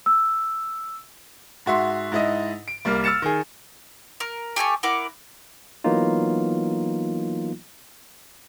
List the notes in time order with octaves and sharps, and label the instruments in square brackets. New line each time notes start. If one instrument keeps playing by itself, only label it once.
[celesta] E6
[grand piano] G#2 F#4 E5 C6
G#2 E4 D#5
D7
C2 G3 A#3 F6
E6 F6 A6 C#7 E7
D#3 G#4
[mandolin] A#4
G4 A4 G#5 C#6
E4 A#4 F#5 D6
[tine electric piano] E3 F#3 A#3 B3 D#4 F4